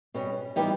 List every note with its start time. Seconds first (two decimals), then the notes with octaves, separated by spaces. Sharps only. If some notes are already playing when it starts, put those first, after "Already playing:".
0.14 B2 G3 C#4
0.56 E3 G3 B3 D#4 G4